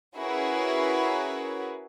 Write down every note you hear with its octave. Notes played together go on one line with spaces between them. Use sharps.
C#4 E4 F#4 G#4 A#4 B4